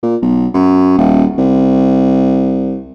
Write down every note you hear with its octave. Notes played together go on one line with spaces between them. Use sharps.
A#2
B1
F#2
D#1
C2